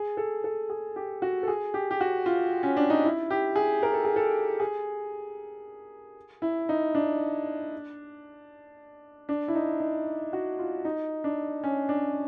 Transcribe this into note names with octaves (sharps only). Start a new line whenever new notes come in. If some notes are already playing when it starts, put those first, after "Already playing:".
Already playing: G#4
A4
A4
G#4
G4
F#4
A4
G#4
G4
G4
F#4
F4
C#4
D4
D#4
E4
G4
G#4
A#4
A4
G#4
A4
G#4
E4
D#4
D4
D4
E4
D#4
D#4
F#4
F4
D#4
D4
C#4
D4